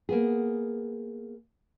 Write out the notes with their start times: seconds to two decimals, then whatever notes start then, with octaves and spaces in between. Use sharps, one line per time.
0.09 A#3 B3 G#4